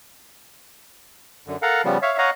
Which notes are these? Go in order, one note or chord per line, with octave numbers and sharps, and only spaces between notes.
F#2 D3
A4 A#4 F5 F#5
C#3 F3 G3 B3
C#5 E5 F5
C#5 D#5 F5 F#5 A#5